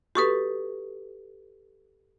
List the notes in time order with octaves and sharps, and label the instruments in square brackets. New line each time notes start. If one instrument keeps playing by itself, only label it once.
[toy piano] F#4 C#6 D#6 [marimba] G4 A4 B4